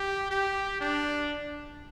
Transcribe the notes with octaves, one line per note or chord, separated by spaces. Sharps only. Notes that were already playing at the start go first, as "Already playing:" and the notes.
Already playing: G4
G4
D4